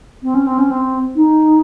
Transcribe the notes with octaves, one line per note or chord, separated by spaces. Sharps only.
C4
C#4
C4
C#4
C4
D#4